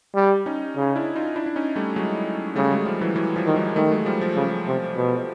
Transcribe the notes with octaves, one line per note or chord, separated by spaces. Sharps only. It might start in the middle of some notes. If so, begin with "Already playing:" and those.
G3
C#4 D#4
C#3
D4 E4
D#4 F4
D4 E4
D4
C#4 D#4
G3 A3
F#3 G#3
C#3 G3 A3
F#3 G#3
F3 G3
E3 F#3
E3 F#3
F3 G3
D#3
F#3 G#3
D#3 G3 A3
F#3 G#3
F3 G3
F3
C#3
C3
B2